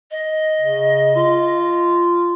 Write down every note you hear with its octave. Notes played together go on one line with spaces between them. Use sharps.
D#5
C#3
F4